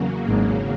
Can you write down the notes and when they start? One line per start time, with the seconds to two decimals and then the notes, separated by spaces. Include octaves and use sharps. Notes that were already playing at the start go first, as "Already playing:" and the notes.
Already playing: E2 C#3 F#3 A#3
0.28 G#1 G#2